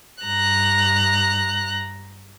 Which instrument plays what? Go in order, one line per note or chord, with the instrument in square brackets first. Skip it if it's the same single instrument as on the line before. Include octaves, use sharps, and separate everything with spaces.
[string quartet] G2 A#5 F#6